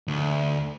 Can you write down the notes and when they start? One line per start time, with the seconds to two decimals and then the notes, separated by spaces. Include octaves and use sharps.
0.08 D2